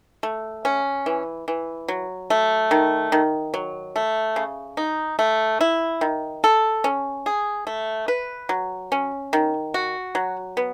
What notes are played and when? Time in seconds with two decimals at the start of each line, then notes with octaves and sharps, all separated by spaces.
0.23 A3
0.65 C#4
1.06 E3
1.48 E3
1.88 F#3
2.30 A3
2.71 D#3
3.12 D#3
3.54 F#3
3.96 A3
4.36 C#3
4.77 D#4
5.19 A3
5.61 E4
6.01 D#3
6.44 A4
6.84 C#4
7.26 G#4
7.67 A3
8.08 B4
8.49 F#3
8.92 C#4
9.33 D#3
9.74 F#4
10.15 F#3
10.57 B3